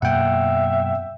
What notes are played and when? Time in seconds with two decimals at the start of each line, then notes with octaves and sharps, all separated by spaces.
0.02 F#2 B2 A#3 E5 F#5 G5